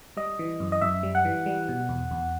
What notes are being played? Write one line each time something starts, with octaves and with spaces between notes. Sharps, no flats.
G3 D#5
E3
F#2
D#5
F#2 E5
G3
F#5
E3
G3
B2
E2
E2